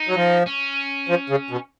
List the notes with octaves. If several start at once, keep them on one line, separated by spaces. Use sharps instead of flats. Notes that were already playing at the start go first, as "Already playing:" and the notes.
Already playing: D#4
F#3
F3
C#4
F3
C#3
B2